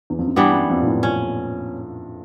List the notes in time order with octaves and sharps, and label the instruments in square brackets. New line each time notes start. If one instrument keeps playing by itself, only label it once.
[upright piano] E2
F2
F#2
[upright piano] G2 [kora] E3 G3 B3 D4
[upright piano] F#2
F2
A#2
A2
[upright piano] A#2 [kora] C#4